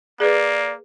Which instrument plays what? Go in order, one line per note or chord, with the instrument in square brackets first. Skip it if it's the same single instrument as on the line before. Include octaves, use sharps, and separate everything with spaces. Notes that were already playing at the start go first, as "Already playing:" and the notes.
[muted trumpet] A#3 [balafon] G#4 B4 [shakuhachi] D5